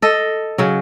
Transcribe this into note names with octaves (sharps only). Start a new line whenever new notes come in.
A4 D#5
C#3 F#3